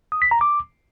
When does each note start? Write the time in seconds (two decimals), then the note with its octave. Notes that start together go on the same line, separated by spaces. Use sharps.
0.12 D#6
0.22 B6
0.31 A#5
0.41 D6